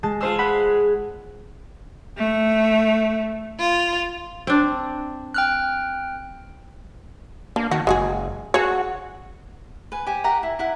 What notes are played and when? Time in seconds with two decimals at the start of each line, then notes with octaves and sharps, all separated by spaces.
0.03 G#3 A5 A6
0.21 G#3 F4 C5 E6
0.39 F#5 B5
2.16 A3
3.60 F4
4.47 C4 D4
5.34 G5 F6 F#6
7.56 A#3 D4
7.71 D#3 F#4
7.87 F#1 G#3 F#4 G#4
8.54 F#4 G#4 C#5
9.92 B4 G#5
10.06 G4 C5 G#5
10.24 G4 A#4 F#5 A#5
10.43 E4
10.59 E4 F#5